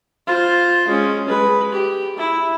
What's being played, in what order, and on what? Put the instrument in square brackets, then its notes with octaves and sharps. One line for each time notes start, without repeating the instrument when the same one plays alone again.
[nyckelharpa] F4 C5
G#3 C#4
G#3 B4
G4
E4